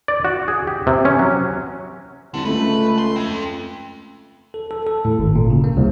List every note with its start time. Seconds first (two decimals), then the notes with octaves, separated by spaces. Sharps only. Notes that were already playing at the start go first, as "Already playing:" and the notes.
0.08 D5
0.25 F#4
0.48 G#4
0.67 G4
0.87 C3
1.05 C#4
1.19 F#3
2.34 C2 D3
2.45 C#2 A3 B4
2.98 C6
3.16 C4 A4
4.54 A4
4.71 A4
4.87 A4
5.05 A2
5.19 G#1
5.35 A#2
5.50 C#3
5.64 A#3
5.77 C2